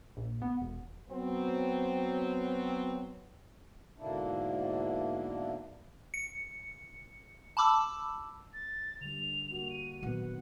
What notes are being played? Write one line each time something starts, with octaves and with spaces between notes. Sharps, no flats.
A#1
B3
E1
F#3 B3 C4
G#2 B2 D3 A#3 D4 E4
C#7
A5 B5 D6 E6
A6
D3 G3 F7
A#3 F#4
D#7
A#2 D#3 F#3 B3 F#5